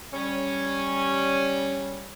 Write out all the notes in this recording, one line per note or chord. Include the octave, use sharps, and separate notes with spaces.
G3 C#4